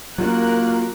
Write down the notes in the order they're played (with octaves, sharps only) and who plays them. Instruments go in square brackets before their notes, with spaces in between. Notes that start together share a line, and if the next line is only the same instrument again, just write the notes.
[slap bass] F#3 C4 C#4 [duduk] A#3 [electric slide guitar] F4 F#4 [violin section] A#4 F#6